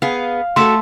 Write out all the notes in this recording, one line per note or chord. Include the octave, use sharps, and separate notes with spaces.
B3 G#4 F5
A3 F#4 G#4 A4 E5 C6